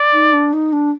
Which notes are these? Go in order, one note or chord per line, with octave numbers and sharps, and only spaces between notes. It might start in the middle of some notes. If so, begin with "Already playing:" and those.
Already playing: D5
D#4
D4
D#4
D4